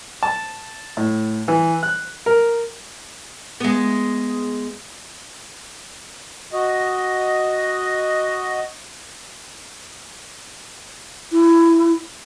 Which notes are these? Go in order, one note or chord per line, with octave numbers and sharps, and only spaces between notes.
A5
A2
E3
F#6
A#4
G#3 B3
F#4 D#5
E4